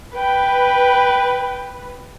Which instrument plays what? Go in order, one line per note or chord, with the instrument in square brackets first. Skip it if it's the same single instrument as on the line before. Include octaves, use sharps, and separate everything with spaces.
[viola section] B4 [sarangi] G5